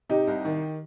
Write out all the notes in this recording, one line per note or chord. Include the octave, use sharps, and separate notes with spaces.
C3 D#4 G4
C2
D#3